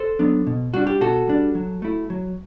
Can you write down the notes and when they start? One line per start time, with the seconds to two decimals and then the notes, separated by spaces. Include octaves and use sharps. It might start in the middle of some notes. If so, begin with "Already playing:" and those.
Already playing: A4 C5
0.19 F#3 B3 D4
0.47 B2
0.74 G3 D4 F#4
0.87 G4
1.01 B2 F#4 A4
1.28 G3 D4
1.55 F#3
1.82 A3 E4
2.10 F#3